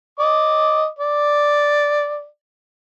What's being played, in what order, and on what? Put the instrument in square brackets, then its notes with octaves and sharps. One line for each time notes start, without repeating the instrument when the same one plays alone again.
[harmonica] D#5 D6
D5